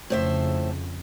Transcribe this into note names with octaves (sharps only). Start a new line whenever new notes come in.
F2 A2 C#3 C5 E5